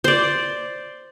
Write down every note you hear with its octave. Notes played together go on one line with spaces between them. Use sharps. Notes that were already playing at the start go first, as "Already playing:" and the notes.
C5 D5